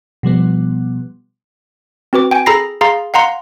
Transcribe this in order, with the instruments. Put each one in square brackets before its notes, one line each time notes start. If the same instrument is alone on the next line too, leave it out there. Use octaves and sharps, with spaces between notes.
[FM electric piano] B2 F3 G3 B3
[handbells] C4 F#4 B4 D6
G5 G#5
G#4 A4 A#5 B5 A#6 C7
G#4 F5 A#5 C6 A6
F5 F#5 A#5 C6